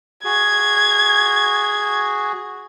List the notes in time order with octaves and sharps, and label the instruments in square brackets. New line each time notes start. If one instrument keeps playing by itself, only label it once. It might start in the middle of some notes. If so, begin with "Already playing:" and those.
[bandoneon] F#4 G#4 [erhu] G#6